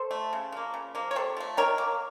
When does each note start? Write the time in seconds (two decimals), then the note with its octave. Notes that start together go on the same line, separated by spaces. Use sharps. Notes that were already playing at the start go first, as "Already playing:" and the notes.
Already playing: A4 C5
0.11 A3
0.33 C#3
0.52 F3 A#3
0.74 C#3
0.95 F3 A#3
1.11 C#5
1.16 C3 A4 C5
1.37 F3 A3
1.57 D#3 A#4 C#5
1.78 A#3